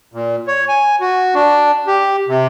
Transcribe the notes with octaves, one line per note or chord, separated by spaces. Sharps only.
A#2
C#5
G#5
F#4
D4
G4
C3